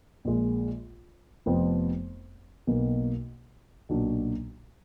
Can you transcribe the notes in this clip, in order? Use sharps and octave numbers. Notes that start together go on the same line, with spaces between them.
A#1 A#2 G#3
F1 F2 F3 B3
B1 B2 A#3
B1 A#2 F#3 D4